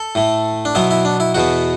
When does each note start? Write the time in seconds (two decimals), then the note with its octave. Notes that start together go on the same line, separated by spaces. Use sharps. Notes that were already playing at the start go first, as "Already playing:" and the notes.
Already playing: A4
0.15 A2 A3
0.65 D4
0.75 B2 F#3 B3 E4
0.91 E4
1.05 D4
1.20 E4
1.35 E2 B2 B3 F#4